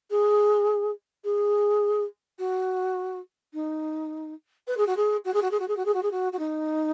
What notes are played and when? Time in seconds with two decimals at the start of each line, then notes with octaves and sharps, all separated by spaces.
0.10 G#4
1.24 G#4
2.39 F#4
3.54 D#4
4.68 B4
4.77 G#4
4.87 F#4
4.97 G#4
5.25 F#4
5.34 G#4
5.42 F#4
5.51 G#4
5.60 F#4
5.68 G#4
5.77 F#4
5.85 G#4
5.94 F#4
6.03 G#4
6.11 F#4
6.33 F#4
6.39 D#4